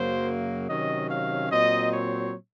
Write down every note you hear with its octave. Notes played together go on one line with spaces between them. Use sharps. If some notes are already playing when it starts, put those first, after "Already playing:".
Already playing: F#2 C#3 F#3 A#3 C5
C3 D#3 F#3 C#4 D#5
F5
A#2 F#3 C4 D#5
C#5